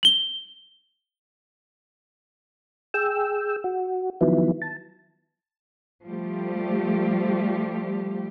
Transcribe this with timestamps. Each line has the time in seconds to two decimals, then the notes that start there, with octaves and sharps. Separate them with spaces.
0.03 F#7 G7
2.94 G#4 G5 E6
3.64 F#4
4.21 D#3 F3 F#3 B3 E4
4.62 A5
6.05 F3 G3 A3 G4